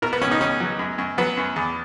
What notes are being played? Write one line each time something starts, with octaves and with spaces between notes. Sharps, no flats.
B2 A#4
B3
C#2 C#4
D#4
C#2 C#4
F#3
F#2
F#2
F#3 B3
F#2
E2